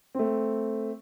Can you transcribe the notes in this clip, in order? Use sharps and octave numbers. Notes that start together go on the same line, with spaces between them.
A3 C4